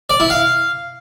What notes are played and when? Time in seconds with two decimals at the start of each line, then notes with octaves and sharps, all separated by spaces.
0.10 D5
0.20 E4
0.30 F5